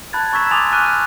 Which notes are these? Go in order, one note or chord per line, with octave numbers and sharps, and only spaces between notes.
A5 B5 F#6 G#6 A6
A#5 C#6 E6 G#6 B6 E7
G#5 C6 D6 D#6 A6 F7
C#6 F6 F#6 D#7
F#6